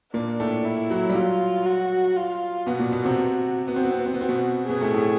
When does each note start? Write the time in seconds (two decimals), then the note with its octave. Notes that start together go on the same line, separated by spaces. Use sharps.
0.14 A#2 A#3 D4
0.40 A2 A3
0.65 E4
0.91 F#3
1.09 G3
1.15 F#3 F4
1.66 F#4
2.17 F4
2.67 B2 B3 F#4
2.79 A#2 A#3
2.92 B2 B3
3.04 C3 C4
3.67 B3 F#4
3.76 C4
3.83 B3
3.91 C4
3.98 B3
4.06 C4
4.14 B3
4.19 C4 F#4
4.28 B2 B3
4.69 B2 B3 G#4
4.81 A2 A3
4.94 A2 A3